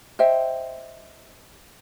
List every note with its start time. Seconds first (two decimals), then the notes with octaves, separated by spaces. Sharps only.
0.19 C5 D#5 E5 G5